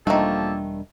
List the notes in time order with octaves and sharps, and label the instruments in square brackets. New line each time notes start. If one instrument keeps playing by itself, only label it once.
[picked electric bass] E1 G3 D4 [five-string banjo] D#3 A3 [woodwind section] F3 A#3 A4